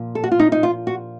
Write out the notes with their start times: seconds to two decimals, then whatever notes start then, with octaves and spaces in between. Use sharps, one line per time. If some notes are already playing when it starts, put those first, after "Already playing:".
Already playing: A#2 F3
0.15 A4
0.24 F#4
0.32 F4
0.39 D#4
0.52 D#4
0.63 F4
0.87 F#4